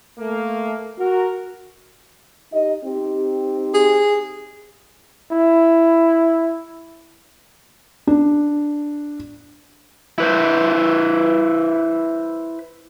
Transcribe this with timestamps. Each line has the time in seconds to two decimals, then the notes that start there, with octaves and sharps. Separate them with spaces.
0.19 A3 A#3
0.98 F#4 A#4
2.53 D#4 G4 D#5
2.84 C4 D#4 G4
3.74 G#4
5.31 E4
8.07 D4
10.18 E4 B4 C5